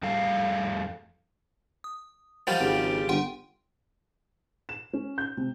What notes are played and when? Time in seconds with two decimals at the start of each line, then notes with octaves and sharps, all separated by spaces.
0.03 F2 G3 A3 A4 F5
1.84 D#6
2.47 D#3 F3 G3 F#5 G5 G6
2.60 G#1 C#3 F4 G4
3.09 G1 F#5 G5 C6
4.69 E7
4.93 C#4
5.18 G6
5.37 C3